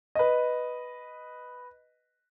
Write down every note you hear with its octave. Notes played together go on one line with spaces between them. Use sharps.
B4 D#5